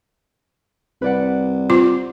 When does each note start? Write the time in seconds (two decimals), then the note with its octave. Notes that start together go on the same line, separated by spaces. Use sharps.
1.02 C2 B4 D5 F#5
1.70 C4 F4 D6